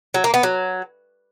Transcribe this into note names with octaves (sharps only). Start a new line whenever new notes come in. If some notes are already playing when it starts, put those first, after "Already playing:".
F#3
A#3
B3
F#3